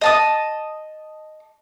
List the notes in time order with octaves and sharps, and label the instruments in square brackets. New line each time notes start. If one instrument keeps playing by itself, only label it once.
[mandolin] D#5 A5 D#6